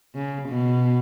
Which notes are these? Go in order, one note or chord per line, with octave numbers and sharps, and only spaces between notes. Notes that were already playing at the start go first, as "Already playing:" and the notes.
C#3
B2